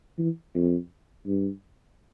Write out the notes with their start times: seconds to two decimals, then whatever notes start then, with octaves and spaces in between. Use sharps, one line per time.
0.18 E3
0.55 F2
1.27 G2